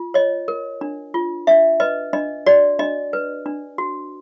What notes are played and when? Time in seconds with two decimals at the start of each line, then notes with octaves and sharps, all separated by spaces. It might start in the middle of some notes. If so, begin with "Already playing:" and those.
Already playing: F4
0.14 C#5 D#5
0.48 A#4
0.81 D4
1.14 F4
1.47 D4 E5
1.80 B4 D#5
2.13 D4 D#5
2.46 F#4 D5
2.79 D4 D#5
3.13 B4
3.46 D4
3.78 F#4